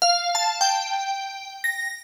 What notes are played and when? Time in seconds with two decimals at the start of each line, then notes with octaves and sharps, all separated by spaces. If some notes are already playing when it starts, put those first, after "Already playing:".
0.02 F5
0.35 A5
0.61 G5
1.64 A#6